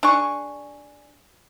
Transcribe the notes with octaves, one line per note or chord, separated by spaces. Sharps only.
D4 G#4 C#6